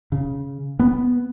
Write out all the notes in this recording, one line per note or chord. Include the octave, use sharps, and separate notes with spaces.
C#3
B3